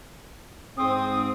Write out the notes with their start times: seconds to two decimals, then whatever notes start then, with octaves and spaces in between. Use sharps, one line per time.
0.78 G#2 C4 D#6